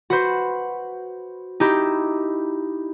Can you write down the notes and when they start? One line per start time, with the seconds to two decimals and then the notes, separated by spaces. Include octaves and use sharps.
0.10 F#4 B4 C5
1.60 D#4 E4 G4